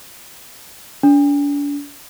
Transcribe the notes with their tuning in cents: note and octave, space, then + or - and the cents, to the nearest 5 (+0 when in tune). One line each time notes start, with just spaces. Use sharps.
D4 -40